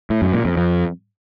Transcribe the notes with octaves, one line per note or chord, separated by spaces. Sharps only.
A2
F#2
A#2
F2
F2